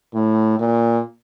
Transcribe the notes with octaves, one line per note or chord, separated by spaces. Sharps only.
A2
A#2